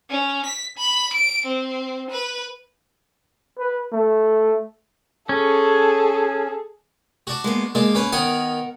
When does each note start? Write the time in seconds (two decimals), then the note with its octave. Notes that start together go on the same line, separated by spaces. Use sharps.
0.10 C#4
0.46 B6
0.77 B5
1.13 D7
1.46 C4
2.10 B4
3.59 B4
3.92 A3
5.29 C#4 G#4 A4
7.27 D4 F#4
7.44 G#3 A#3 B3
7.75 G#3 A#3 D4
7.95 C#4 B4
8.12 D#3 B3 A#4 F#5 G#5